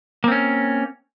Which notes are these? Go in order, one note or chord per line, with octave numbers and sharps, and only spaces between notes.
A#3 C4 C#4